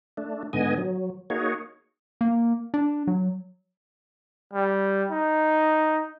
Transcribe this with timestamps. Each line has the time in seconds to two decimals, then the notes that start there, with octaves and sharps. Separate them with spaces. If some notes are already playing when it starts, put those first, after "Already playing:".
0.17 A3 D4
0.53 G#2 D3 B3 D#5 G#5
0.78 F#3
1.30 A#3 D#4 F#4 G#4 C#5
2.21 A#3
2.74 D4
3.07 F#3
4.53 G3
5.09 D#4